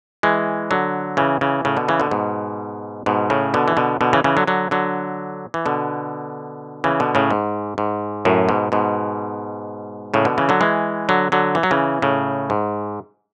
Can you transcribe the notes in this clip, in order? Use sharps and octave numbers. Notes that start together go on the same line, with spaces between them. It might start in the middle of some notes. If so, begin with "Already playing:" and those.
E3 G#3
D3 F#3
C#3 E3
C#3 E3
A2 C#3
B2 D3
C#3 E3
B2 D3
G#2 B2
G#2 B2
A2 C#3
B2 D3
E3
B2 D3
B2 D3
C#3 E3
C#3 E3
D3 F#3
D3 F#3
D3 F#3
E3
B2 D3
C#3 E3
B2 D3
A2 C#3
G#2
G#2
F#2 A2
G#2 B2
G#2 B2
A2 C#3
B2 D3
C#3 E3
D3 F#3
E3 G#3
D3 F#3
D3 F#3
E3
F#3
C#3 E3
A2 C#3
G#2